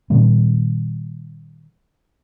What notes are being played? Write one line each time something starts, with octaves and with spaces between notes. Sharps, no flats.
A#2 D#3 G3 B3